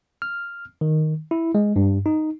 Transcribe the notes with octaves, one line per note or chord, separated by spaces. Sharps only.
F6
D#3
E4
G#3
G2
D#4